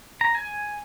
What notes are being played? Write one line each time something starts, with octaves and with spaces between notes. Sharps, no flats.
A#5
G#5